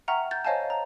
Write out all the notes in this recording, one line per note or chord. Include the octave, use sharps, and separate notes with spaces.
E5 F#5 G5 A#5 C#6 F6
G6 A6
C5 C#5 D#5 F5 G#5 A5
A#5